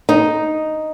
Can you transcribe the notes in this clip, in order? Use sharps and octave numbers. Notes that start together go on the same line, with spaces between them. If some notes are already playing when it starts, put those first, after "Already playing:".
D#4